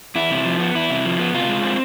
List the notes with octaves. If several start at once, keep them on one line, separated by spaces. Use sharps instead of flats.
E2 E4
C3
F3
B3
E2 E4
C3
F3
B3
C3 F4
G#3
C4